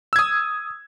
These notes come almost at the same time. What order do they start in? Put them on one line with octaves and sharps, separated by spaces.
E6 G#6 D#6